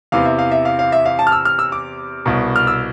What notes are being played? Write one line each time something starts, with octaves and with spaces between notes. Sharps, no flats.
E2 C3 E3 F5
E5
F5
E5
F5
F5
E5
F5
A5
F6
E6
F6
E6
D6
C2 B2
F6
E6